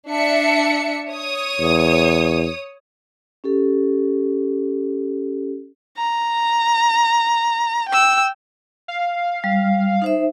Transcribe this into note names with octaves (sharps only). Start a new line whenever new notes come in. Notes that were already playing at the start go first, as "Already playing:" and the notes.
D4 E5 C#7
C#5 D#6
E2
C#4 G4 A4
A#5
G5 E6
F5
G3
D#4 C5 E5